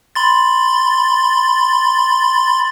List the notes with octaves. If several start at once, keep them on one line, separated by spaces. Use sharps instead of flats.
B5 C6 A6